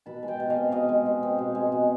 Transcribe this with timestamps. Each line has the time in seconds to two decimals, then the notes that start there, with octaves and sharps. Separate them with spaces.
0.06 B2 A5 B5
0.23 G#3
0.28 G5 A5
0.40 B2
0.50 D#5 F5
0.57 C4
0.72 B2 D#5 F5
0.89 G#3
1.06 B2
1.23 C4
1.38 B2
1.55 G#3
1.72 B2